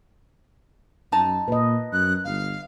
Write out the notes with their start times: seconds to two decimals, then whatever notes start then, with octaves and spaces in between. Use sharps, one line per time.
1.12 F#2 D#4 A5
1.48 A#2 B4 D#5
1.93 F#2 F#6
2.25 G1 F5